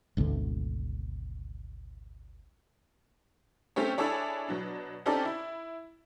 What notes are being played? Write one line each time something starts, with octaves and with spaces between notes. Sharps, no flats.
G#1 D2 B2 D3
A3 C4 C#4 G4 C#5
D4 E4 G#4 A4 C#5 D5
B2 F#3 D4
C4 C#4 D#4 G4 A4 D5
E4